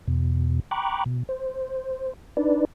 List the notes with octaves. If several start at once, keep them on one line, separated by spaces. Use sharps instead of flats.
E2 B2
G5 A#5 B5 C#6 D6 F#6
B2
C5
D4 D#4 B4 D5